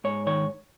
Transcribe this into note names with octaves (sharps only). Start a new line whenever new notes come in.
G#2 C#5
D#3 C#5